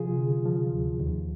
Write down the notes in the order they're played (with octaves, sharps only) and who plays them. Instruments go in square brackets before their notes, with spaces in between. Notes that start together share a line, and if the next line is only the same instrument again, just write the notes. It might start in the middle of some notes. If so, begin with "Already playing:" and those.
Already playing: [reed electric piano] C3 F3 F4 G#4
D3
F3
D2
D#2